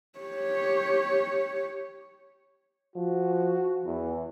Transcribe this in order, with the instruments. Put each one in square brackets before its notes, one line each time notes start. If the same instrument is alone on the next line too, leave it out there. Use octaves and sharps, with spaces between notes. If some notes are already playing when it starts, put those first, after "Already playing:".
[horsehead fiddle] G4 C#5
[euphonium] F3 [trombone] F#4
[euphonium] E2 [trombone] E3